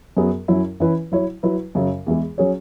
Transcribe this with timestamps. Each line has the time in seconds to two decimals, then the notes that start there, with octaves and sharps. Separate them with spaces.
0.17 F#2 F#3 B3 G#4
0.48 F#2 F#3 C#4 E4
0.80 E3 C#4 E4 B4
1.12 F#3 E4 C#5
1.43 F#3 E4 B4
1.75 F#2 C#3 F#3 C#4
2.06 E2 E3 G#3
2.38 F#3 C#4 G#4 C#5